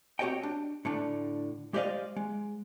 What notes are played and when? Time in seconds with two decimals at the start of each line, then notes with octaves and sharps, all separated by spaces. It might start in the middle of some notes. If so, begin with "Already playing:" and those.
0.19 C4 F#4 G4 C#5 D#5 G5
0.43 D4
0.85 A2 D3 D4
1.73 G#3 G4 C5 D5 D#5 F5
2.16 G#3